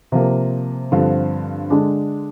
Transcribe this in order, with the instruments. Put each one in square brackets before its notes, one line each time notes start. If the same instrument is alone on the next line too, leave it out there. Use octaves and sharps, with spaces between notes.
[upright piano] C3 F3 A#3
G2 D3 F3 C4 F4
D3 G#3 D4